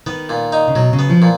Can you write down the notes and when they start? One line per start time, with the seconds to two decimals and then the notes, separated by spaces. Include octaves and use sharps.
0.06 D#3 B3
0.29 A#2
0.52 D#4
0.68 C#3
0.75 B2 F#3
0.93 C#3
0.99 B3
1.10 F3
1.22 A#2